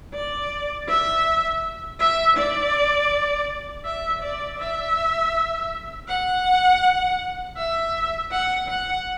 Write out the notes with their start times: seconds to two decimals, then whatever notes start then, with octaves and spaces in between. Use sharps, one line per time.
0.14 D5
0.89 E5
1.99 E5
2.37 D5
3.85 E5
4.22 D5
4.59 E5
6.08 F#5
7.57 E5
8.31 F#5
8.68 F#5